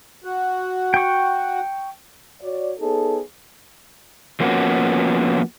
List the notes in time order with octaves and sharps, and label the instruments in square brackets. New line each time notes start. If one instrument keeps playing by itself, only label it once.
[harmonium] F#4 F#5
[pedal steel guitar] G5 C#6
[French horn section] F#4 C#5 D5
B3 D#4 G#4 A4 C#5
[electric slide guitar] F3 A#3 B3 C#4 F#4